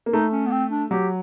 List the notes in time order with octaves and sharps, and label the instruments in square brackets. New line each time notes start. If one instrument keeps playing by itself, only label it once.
[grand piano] A#3
[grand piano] A3 [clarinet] D#4
[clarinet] C#4
B3
C4
D4
[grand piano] F#3 [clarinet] G4